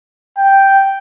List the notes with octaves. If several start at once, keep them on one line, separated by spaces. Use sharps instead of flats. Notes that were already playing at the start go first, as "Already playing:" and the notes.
G5